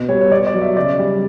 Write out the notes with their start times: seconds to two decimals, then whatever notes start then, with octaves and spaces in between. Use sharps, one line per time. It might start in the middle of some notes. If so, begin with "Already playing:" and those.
Already playing: B2
0.09 G3 C#5
0.21 C#5
0.31 B2 D5
0.47 D5
0.54 F#3
0.62 E5
0.76 C#3 D5
0.99 G3